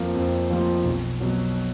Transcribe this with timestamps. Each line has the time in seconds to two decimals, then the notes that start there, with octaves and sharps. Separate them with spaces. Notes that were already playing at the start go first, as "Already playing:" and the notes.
Already playing: F2 F3 A#3 F4
0.14 F2
0.50 F3 A#3 F4
0.84 B1
1.20 B2 F#3